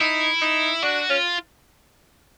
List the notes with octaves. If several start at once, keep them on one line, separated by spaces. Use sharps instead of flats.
D#4 E4
D#4
D4 F#4
C#4 F4